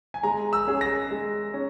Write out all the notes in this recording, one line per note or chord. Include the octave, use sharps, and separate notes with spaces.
G#5
G#3 A#5
E6
C#4 G#4
A#6
G#3
C#4